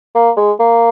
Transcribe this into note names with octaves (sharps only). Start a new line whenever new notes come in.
A#3
G#3
A#3